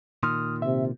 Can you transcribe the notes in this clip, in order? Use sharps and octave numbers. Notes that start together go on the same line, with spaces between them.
A#2 D#3 C6 D#6 F6
C3 E5